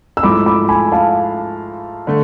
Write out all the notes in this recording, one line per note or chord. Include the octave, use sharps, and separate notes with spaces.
E6
G#2 F3 A3 E4 A4 B5 D6
B5 D6
G#5 B5
F5 A5
D3 A3